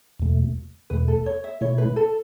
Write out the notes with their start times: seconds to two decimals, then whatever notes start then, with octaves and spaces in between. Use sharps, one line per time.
0.19 E2 B2 A3
0.90 E2 B2 A3 B4
1.08 A4
1.26 C#5
1.44 E5
1.61 B2 A3 E4 C#5
1.78 B4
1.96 A4